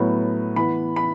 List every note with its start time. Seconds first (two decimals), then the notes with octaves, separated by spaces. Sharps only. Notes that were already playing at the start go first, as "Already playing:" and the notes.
Already playing: A2 F#3 B3
0.56 E3 B3 B5
0.96 B5